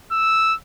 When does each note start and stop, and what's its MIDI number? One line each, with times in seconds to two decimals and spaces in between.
0.12 0.55 88